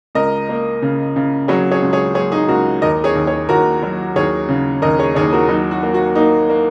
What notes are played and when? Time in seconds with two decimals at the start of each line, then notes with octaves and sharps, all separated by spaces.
0.15 C#2 A#4 D#5
0.49 A#3
0.82 C#3
1.16 C#3
1.48 F#3 G#4 C#5
1.71 G#4 C#5
1.82 C#2
1.93 G#4 C#5
2.15 F#3 G#4 C#5
2.32 D#4 G#4
2.48 C#2 F#4 A#4
2.82 D#2 A#4 D#5
3.04 G#4 C#5
3.15 D#2
3.27 G#4 C#5
3.49 D#2 F#4 A#4
3.83 F#3
4.16 D#2 G#4 C#5
4.49 C#3
4.82 D#2 A#4 D#5
4.99 G#4 C#5
5.15 D#2 G#4 C#5
5.33 F#4 A#4
5.49 F#3 D#4
5.71 F#4
5.83 A#3
5.94 F#4
6.15 A#3 D#4
6.50 A#3